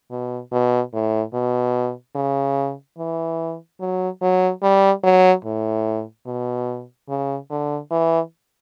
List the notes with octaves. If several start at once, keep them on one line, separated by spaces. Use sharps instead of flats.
B2
B2
A2
B2
C#3
E3
F#3
F#3
G3
F#3
A2
B2
C#3
D3
E3